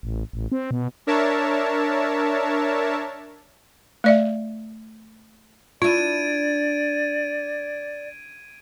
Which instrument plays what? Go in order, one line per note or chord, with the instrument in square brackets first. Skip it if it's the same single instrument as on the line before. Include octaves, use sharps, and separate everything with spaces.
[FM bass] A1
A1
C4
B2
[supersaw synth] D4 A#4 C#5 E5 A5
[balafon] A3 D5 E5
[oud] D4 E4 [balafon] F4 [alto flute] D5 [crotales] G#6 D7 D#7